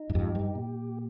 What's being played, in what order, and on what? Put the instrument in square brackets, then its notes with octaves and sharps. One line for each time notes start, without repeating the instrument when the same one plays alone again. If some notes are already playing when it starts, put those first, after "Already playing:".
Already playing: [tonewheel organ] D#4
[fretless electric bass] G2
[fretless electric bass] F2 G#2 [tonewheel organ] G4
[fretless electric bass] G2
[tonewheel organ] A#2